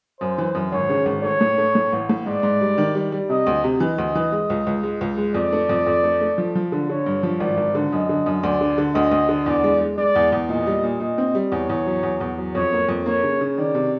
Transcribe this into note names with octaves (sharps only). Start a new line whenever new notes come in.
F#2 C5
E3
F#2
G#1 C#5
C#3
G#1
A3 C#5
A2
A3
A2
A1
A2
G#2 D5
G#2
G3
D#3
G3
G3
C3 D#5
D2
C3
E3 D#5
D2
E3
G#3
C#2
C#2
G#3
C#2
G#3
F2 D5
A3
F2
F2
A3
A3
F3
F3
D3
D3 C#5
G2
F3
G#1 D5
G#1
D3
F#2 D#5
D3
F#2
D2 D5
D3
D3
D2 D#5
D2
D3
E2 D5
G#3
G#3
G#3 D5
E2
E2
A#2 D#5
G3
A#2
A#2 D#5
C4
G3
E2 C#5
E2
F#3
E2
E2
F#3
F2 C#5
A#3
F2
A#3 C#5
C#3
C#3
D#3 D5
C3